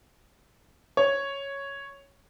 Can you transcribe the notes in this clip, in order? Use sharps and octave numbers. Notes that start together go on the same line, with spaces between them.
C#5